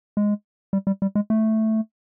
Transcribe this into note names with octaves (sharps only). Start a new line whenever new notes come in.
G#3
G3
G3
G3
G#3
A3